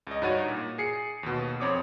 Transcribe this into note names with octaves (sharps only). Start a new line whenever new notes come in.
C#2 D#5
G2 D#4 F#4 C#5 A6 D#7
A#2
G#4 C7 C#7
D#2 B2
F2 C4 C#5 D6 D#6